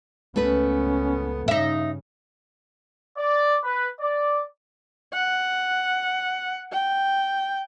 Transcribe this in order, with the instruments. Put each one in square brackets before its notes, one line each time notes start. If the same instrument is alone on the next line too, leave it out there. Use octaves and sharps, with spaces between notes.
[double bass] C#2 B3 [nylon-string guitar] A3 B4 [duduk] C#4
[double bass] G2 C#3 [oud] D#4 E5
[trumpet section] D5
B4
D5
[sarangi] F#5
G5